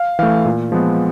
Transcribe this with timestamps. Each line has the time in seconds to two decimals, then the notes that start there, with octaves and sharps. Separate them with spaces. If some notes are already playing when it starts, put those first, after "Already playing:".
Already playing: F5
0.19 E3 A3 F5
0.45 A#2
0.72 F3 G#3 B3